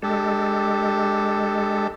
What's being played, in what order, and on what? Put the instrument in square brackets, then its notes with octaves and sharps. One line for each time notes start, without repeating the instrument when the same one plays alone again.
[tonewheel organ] G#3 A4 [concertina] D4 G4